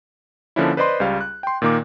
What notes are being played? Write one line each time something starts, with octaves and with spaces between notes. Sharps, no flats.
D3 F3 A#3 C#4 D4 E4
B4 C5 D5 D#5 B5 C6
C#2 G3 F5
F#6
G5 C6
A#2 D#3 A#3 D6